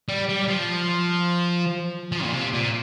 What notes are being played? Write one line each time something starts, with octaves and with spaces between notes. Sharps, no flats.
G3
G3
F3
F3
A#2
C3
A#2